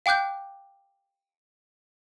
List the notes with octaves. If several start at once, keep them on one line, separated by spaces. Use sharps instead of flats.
F5 G5 D6 F#6 G6